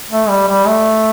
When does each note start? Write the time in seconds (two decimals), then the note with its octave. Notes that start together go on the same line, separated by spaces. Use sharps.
0.11 A3
0.29 G3
0.47 G3
0.67 A3